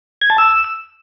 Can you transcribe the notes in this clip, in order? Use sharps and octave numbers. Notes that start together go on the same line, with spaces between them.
G#6
A5
E6